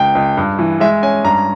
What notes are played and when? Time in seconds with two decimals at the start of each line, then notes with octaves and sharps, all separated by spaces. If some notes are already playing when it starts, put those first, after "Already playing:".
Already playing: C#2 G5
0.15 C#2
0.37 G2
0.59 E3
0.80 G#3 E5
1.03 C#4 G#5
1.24 G2 A#5